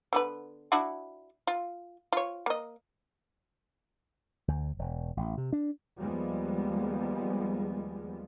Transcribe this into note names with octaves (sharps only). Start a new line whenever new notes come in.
D3 B3 B4
D4 E4 F#4
F4
F4 C#5
A#3 D#5
D2
E1
A1
C3
D4
D#2 F3 G3 G#3 B3